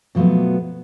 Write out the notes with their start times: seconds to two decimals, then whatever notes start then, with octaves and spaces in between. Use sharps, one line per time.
0.15 B2 F3 F#3 A3 B3